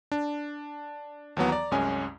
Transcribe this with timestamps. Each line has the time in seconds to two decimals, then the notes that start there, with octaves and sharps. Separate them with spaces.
0.12 D4
1.37 D#2 E3 F#3 B3
1.49 D5 A#5
1.71 C2 F#2 G#3 C#4 G#5